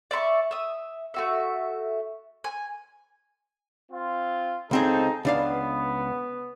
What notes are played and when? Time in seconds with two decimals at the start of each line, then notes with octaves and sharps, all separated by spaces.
0.11 D5 E5 B5 C#6
0.51 E5 D#6
1.14 A3 F#4 E5
2.44 G#5
3.92 C4 F4
4.71 C#2 C4 D#4 G#4 A4 C5
5.25 C#2 B3 D4 F5